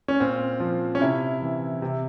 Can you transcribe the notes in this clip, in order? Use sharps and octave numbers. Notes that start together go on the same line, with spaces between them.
C#4
A#2 C4
F3
C#4
C3 E4
E3
C3